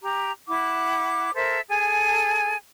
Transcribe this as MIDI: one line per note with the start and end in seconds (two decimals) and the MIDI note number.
0.01 0.30 67
0.01 0.30 82
0.48 1.31 64
0.48 1.31 78
0.48 1.31 86
1.35 1.59 69
1.35 1.59 70
1.35 1.59 72
1.35 1.59 76
1.68 2.54 68
1.68 2.54 69
1.68 2.54 80